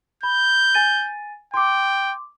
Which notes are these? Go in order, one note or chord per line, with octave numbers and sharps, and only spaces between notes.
B5 G6
G#5 A6 D#7
G5 C6 D6